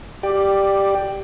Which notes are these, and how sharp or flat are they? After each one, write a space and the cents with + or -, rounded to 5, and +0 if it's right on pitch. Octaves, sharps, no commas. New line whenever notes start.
G4 +0 D5 +15